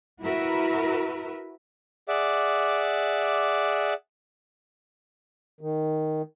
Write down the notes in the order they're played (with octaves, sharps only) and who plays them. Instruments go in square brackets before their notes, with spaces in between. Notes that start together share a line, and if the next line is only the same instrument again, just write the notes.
[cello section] E4 F#4 A#4 B4 E5
[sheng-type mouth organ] G#4 D5 E5 F#5 D6
[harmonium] D#3